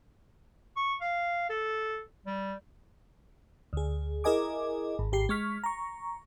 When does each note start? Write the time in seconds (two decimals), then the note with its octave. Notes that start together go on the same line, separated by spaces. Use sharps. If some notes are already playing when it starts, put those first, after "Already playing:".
0.77 C#6
1.01 F5
1.50 A4
2.26 G3
3.73 D2 G#4
4.24 E4 G#4 A#4 D#5 G#5 D6
4.99 G#1
5.12 G#1 G4 C7
5.29 G#3 C#6 F6 B6
5.64 A#5 C#6